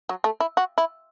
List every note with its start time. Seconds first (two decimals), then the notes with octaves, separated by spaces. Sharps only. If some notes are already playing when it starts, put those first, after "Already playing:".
0.09 F#3
0.24 A3
0.40 E4
0.57 F#4
0.78 E4